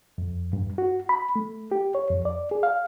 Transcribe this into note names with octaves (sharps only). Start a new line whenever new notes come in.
F2
G2
F#4
B5
A3
G4
C#5
F2
D5
G#4
F5